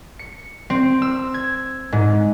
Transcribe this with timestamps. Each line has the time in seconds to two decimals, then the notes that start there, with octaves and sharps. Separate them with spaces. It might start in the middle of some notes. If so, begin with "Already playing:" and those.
0.19 C#7
0.70 C4
1.02 E6
1.34 G#6
1.92 G#2